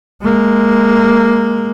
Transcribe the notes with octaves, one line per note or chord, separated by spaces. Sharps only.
G#3 A#3